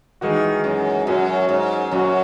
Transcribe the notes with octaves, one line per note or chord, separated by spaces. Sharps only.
D#3 E3 G#3 D#4 F#4
F#2
F#2 F#3 C#4 F#4
G#2
F#2 F#3 C#4 F#4